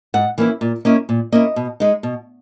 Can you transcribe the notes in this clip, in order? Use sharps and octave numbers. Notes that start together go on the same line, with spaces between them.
G#2 F#5
E3 A#3 C#4 E4
A#2
A#3 C#4 E4 D#5
A#2
A#3 C#4 E4 D#5
B2
G#3 D#4
B2